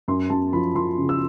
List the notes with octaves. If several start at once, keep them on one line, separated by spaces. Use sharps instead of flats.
F#2 C6
F#2 A5
F3 B5
F3 C6
C#3
E6